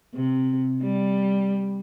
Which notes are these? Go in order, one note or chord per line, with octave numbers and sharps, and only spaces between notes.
C3
G3